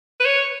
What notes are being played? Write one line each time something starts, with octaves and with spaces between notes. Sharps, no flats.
B4
C#5